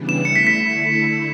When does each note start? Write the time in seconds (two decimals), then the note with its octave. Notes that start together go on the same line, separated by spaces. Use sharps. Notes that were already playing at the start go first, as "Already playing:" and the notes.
Already playing: C#3 E3 G3 B3 D4
0.09 E7
0.25 D3 A3 E4 C#7
0.36 B6
0.47 B6